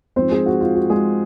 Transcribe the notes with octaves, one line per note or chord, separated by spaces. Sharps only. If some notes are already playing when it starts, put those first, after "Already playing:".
G#2 F3 C4 C5
G#3 G#4
F#4
F4
F#4
G#3 G#4